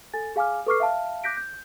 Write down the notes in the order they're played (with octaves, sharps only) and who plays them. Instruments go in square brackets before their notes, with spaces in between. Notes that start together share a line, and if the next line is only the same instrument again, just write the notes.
[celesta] A4 G#5 A6
G#4 F5 G#5 D6 F6
A4 B4 C#6 D6 F6 C7
E5 F5 A5 F6
D6 F#6 G6 A#6 B6 D7
G6